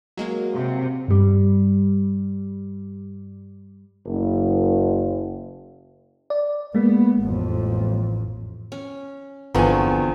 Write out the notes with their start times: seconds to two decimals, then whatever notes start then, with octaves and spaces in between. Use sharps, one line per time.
0.17 F#3 G#3 A#3
0.54 C3
1.08 G2 G3
4.06 F#1
6.30 D5
6.75 G#3 A#3 B3
7.19 A1 F2
8.72 C#4
9.55 G1 E2 D3 F3 C4 B4 G#5 C#6